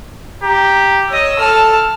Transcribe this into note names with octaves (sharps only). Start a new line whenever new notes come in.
G4 A#5
C#5 D#5 E6
A4 A5 F6